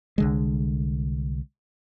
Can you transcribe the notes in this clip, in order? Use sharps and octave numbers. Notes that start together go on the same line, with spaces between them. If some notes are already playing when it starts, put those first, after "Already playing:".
C2 D3 G#3